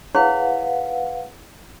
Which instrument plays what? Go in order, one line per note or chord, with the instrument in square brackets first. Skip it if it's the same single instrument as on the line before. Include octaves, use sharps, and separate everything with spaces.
[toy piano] E4 G#4 C#5 [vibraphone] B4 F5 F#5